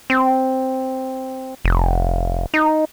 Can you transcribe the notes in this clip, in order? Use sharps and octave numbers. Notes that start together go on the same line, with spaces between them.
C4
F1
D#4